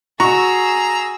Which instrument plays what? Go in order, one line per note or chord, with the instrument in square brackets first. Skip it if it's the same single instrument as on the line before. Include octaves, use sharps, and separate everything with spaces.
[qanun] F#4 [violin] G#4 E6 [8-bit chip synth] A#5 [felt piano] C#6